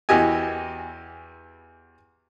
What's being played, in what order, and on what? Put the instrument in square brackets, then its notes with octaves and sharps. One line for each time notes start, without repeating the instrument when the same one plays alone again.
[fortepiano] E2 E3 F#4 G4 D#5 G#5